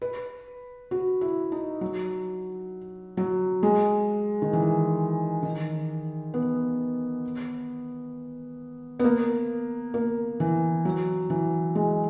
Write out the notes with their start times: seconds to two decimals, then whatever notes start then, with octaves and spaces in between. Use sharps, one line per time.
0.02 B4
0.91 F#4
1.21 E4
1.52 D#4
1.81 F#3
3.17 F#3
3.63 G#3
4.42 D#3
4.53 E3
5.43 D#3
6.34 B3
8.99 B3
9.04 A#3
9.94 A#3
10.40 E3
10.85 F#3
11.30 E3
11.75 G#3